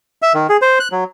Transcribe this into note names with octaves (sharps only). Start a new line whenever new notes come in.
E5
D#3
G#4
C5
F#6
F#3